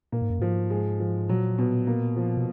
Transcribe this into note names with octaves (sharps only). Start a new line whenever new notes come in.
A#2 A#3
G#2
F#2
G#2 F3
G#3
F3
A#2 F#3
B2
A#3
F3
B2